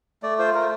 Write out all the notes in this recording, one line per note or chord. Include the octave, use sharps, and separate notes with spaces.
A3 D5
F4 C5
A3 A#4